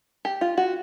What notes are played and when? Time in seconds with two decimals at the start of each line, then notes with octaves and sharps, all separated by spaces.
0.25 G4
0.41 F4
0.57 F#4